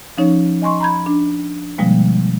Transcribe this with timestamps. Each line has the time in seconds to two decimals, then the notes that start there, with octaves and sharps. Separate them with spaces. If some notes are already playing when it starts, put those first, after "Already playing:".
0.17 F3 C#4 D#4 C#5
0.62 D#5 G#5 C6 C#6
0.80 A#5 B5 G6 G#6
1.06 D4
1.78 B2 D3 F3 G3 G#3 A#3